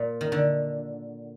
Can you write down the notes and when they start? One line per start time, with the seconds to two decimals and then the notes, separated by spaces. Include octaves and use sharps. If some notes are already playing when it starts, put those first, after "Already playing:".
Already playing: A#2
0.21 D#3
0.32 D3